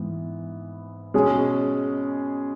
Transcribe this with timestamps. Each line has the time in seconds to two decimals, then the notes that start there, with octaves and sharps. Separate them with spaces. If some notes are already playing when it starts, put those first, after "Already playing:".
Already playing: G#2 E3 B3
1.14 B2 G#3 C#4 G#4